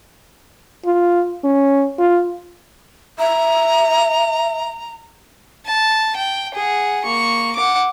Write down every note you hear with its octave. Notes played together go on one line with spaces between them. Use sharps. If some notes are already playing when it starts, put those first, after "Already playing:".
F4
C#4
F4
E5 A#5
A5
G5
G#4 F#5
A#3 C#6
F#5 D6